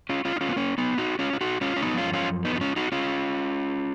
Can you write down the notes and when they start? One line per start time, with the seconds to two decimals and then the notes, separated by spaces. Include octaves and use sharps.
0.09 C#4 F4
0.25 C#4 F4
0.36 D#4
0.41 C#4 F4
0.49 B3
0.56 A#3 C#4
0.78 B3 D#4
0.98 D#4 F#4
1.19 C#4 F4
1.33 F4
1.41 D#4 F#4
1.61 C#4 F4
1.76 C#4
1.82 F#2 F3 B3 D#4
1.97 C#4 F4
2.13 C#4 F4
2.45 B3 D#4
2.56 D#4
2.61 C#4 F4
2.76 D#4 F#4
2.92 C#4 F4